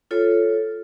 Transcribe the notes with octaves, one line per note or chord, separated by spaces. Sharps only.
F4 A4 C#5